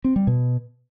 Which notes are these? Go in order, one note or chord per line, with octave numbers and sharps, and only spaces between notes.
C4
G3
B2